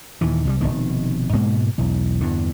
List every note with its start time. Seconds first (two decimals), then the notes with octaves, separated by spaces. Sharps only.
0.21 D#2 A#2 E3
0.45 C2 F3 G3
0.61 F1 C#2 B2 D#3
1.33 G#2 B2 G#3 A#3
1.78 B1 E2
2.21 E2 G2 D3